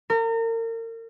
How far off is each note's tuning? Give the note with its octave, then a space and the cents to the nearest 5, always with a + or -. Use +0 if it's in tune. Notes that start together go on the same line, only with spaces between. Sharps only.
A#4 -35